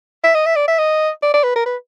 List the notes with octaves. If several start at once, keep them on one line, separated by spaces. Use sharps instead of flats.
E5
D#5
E5
D5
E5
D#5
D5
D5
B4
A#4
B4